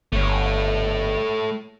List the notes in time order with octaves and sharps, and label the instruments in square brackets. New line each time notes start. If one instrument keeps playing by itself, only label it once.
[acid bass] G1 [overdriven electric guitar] A3 C#5